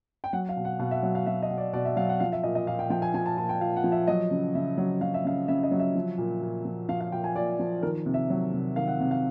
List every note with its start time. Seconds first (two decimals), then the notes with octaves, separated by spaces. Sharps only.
0.24 G5
0.33 F#3 F#5
0.49 F5
0.57 B2
0.65 F#5
0.79 B2 F5
0.91 E5
1.03 F#3
1.15 F5
1.26 F#3 E5
1.43 D#5
1.50 B2
1.58 D5
1.73 B2 D5
1.85 E5
1.96 F#3 F5
2.09 F#5
2.20 F3 F5
2.32 E5
2.43 A#2 D#5
2.55 D#5
2.67 A#2 F5
2.79 G5
2.90 F3 G5
3.02 G#5
3.14 F3 G#5
3.26 A5
3.37 A#2 A5
3.49 G5
3.61 A#2 F5
3.76 F#5
3.84 F3
3.92 E5
4.07 F#3 D#5
4.31 C#3
4.55 C#3 E5
4.78 F#3
5.01 F#3 F5
5.14 E5
5.24 C#3 F5
5.48 C#3 E5
5.63 D#5
5.71 F#3
5.79 E5
5.95 F3
6.18 A#2
6.42 A#2
6.65 F3
6.89 F3 F5
7.01 F5
7.12 A#2 G5
7.24 G#5
7.36 A#2 D5
7.59 F3
7.83 D#3 A#4
8.06 C3
8.14 E5
8.30 F#3
8.53 C3
8.76 D#3 F5
8.88 F#5
9.00 C3
9.11 F5